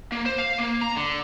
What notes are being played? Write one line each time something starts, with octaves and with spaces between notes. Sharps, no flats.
A#3
C5
F5
A#3
A#5
D3